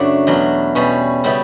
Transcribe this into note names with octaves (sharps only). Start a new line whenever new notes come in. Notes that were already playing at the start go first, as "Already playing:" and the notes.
Already playing: F#2 C#3 F#3 A3 D4
E2 B2 F#3
B2 G3 C#4
C#3 G3 B3 E4